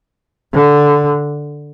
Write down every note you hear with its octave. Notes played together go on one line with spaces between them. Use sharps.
D3